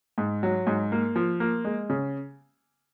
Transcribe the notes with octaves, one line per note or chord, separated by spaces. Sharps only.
G#2
F#3
G#2
A#3
F3
A#3
G#3
C#3